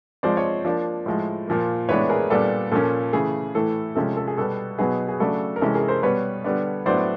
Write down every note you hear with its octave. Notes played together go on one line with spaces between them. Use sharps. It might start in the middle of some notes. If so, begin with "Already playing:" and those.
F3 G#3 C4 C5 D5
C#5 D#5
F3 A#3 D4
A2 F3 G#3
A#2 F3 A#3
A2 E3 G#3 B3 D4 B4 C#5
G#4 A#4
A#2 G3 B3 D4 A4
A#2 F3 A#3 C#4 A4
C#3 E3 A3 G#4
A2 E3 A3 A4
C3 F3 G#3 C#4 A4
A4
G#4
B2 G3 B3 A4
B2 F#3 B3 D#4 G#4
G#4
C#3 F#3 A3 D4 A4
A#4
C3 E3 G#3 C#4 A4
G#4 A#4
A#4 C5
B2 G3 B3 B4 C#5
D3 G3 B3 D4
A2 F#3 B3 D4 C5 D5